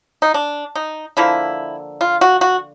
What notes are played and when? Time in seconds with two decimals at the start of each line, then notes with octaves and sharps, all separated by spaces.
0.22 D#4
0.34 D4
0.75 D#4
1.17 D3 F3 A#3 E4
2.01 F4
2.21 F#4
2.41 F#4